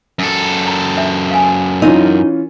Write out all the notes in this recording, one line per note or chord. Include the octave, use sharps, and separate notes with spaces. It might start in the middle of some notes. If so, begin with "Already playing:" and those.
F#2 A4
A#5
D4 E5
F5 G#5
E3 C#4 D#4 F4 A#4